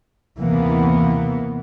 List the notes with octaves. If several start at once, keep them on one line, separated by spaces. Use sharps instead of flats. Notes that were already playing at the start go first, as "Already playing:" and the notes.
D#2 C3 E3 A#3 B3